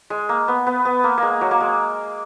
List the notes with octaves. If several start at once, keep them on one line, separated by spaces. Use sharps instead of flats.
G#3
A#3
B3
B3
B3
A#3
G#3 A#3
F#3
A#3
G#3